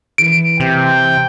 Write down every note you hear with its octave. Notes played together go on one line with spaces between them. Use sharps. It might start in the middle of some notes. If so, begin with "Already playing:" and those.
E3 D7
C3 G5